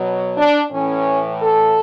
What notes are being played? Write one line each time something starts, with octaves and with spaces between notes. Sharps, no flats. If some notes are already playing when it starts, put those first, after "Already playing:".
Already playing: B2 F#3
D4
A2 E3 C#4
A4